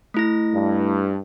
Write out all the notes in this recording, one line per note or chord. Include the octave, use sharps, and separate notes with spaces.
A3 E4 A#6
G2